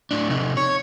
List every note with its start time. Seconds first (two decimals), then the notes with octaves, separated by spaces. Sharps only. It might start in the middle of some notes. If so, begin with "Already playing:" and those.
0.11 A2 D4
0.30 C3 D#4
0.57 C#5